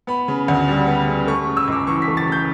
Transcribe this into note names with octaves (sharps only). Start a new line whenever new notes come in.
B3 B5
C#3
D2
G3
B3
C#3
A3 C#6
C#3
E6
C#2 D6
E3 C#6
B6
A3
A6
C#3
G6